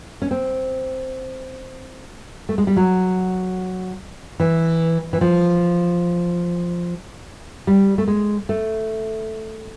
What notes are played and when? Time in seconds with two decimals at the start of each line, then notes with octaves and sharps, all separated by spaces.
0.22 C#4
0.31 C4
2.49 A3
2.58 G#3
2.67 G3
2.76 F#3
4.40 E3
5.13 E3
5.21 F3
7.67 G3
7.98 A3
8.08 G#3
8.49 A3